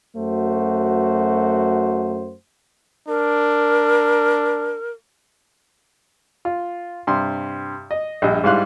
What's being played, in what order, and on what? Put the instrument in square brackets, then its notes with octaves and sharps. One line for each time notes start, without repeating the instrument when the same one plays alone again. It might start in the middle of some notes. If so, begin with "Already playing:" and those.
[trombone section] F#2 A3 F#4 C5
[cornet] D4 [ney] A#4
[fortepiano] F4
G2 C3 C6
D#5
A#1 G2 D#5
G#2 G3 E4 F5 C6 F#6